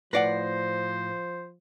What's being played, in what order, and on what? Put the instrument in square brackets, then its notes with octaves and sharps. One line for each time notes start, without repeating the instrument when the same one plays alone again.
[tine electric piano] A2 A#6 C7 [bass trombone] F3 [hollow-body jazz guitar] B4 D5 F#5 [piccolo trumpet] C5